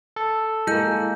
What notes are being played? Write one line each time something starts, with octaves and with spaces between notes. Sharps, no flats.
A4
G#3 A#3 E4 G6